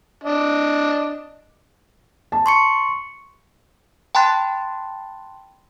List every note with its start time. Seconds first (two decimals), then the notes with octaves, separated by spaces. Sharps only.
0.24 D4 D#5
2.32 A5
2.46 C6 C#6 C#7
4.15 G5 A5 B5 C6 F#6 A6